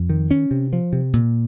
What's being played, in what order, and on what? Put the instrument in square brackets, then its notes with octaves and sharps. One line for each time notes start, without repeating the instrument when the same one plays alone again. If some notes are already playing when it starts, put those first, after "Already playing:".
Already playing: [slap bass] F2
D#3
C#4
C3
F3
C3
A#2